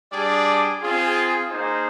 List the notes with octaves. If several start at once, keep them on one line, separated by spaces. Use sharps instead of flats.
G3 D4 G#4 D5
C4 F4 G#4
A#3 D#4 G#4 C5